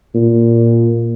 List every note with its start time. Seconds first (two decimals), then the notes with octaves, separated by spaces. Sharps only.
0.14 A#2